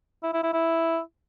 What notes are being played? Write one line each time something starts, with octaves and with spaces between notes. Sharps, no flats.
E4
E4
E4
E4